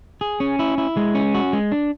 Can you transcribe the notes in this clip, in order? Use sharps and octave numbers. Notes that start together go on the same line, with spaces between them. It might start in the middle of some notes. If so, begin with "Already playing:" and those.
G#4
C#4
E4
E4
G#3
C#4
F#4
G#3
D4